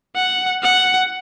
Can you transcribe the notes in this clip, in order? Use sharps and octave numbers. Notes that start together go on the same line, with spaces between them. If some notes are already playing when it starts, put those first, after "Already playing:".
F#5
F#5